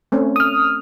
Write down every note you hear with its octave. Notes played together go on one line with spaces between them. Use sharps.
A3 C4 C#4
D#6 F6